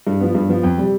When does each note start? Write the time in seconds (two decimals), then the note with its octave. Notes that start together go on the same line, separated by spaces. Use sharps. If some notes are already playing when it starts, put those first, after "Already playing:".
0.07 G2
0.20 F3 B3
0.35 G2
0.49 F3 B3
0.63 F2
0.78 C3 G3